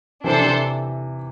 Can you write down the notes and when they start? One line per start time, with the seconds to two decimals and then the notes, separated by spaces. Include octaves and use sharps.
0.24 C3 E3 D4 A4 C5
0.41 C3 E3